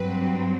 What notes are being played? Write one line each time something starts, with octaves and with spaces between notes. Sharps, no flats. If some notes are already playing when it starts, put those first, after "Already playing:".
Already playing: G2 F#3 C4 B4